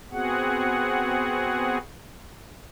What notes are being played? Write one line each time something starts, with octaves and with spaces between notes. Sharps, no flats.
B3 C4 F#4 G#4 F#5